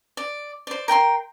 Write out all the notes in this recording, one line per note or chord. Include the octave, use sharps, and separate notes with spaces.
D5
C5 D5
A#4 G5 A5 C6